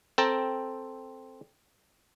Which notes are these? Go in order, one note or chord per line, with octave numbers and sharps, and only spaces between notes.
C4 A4 G5 A5 A#5